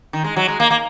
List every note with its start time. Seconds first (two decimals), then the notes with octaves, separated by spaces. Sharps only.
0.13 D#3
0.24 G#3
0.36 F#3
0.48 G#3
0.60 A#3
0.71 A#3